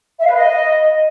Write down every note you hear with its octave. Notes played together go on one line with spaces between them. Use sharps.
E5
F5
B4
D#5